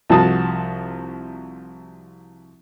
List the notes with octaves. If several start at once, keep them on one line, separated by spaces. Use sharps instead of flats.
C2 F3 F#4 A5 D#6